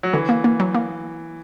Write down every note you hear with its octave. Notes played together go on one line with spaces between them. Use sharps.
F#3
D3 E3
A#3
A#3
F#3
A#3